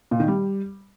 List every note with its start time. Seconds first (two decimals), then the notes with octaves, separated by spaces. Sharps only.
0.11 A#2
0.20 D#3
0.28 G3